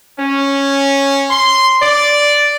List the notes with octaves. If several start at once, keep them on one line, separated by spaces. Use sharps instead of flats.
C#4
C6
D5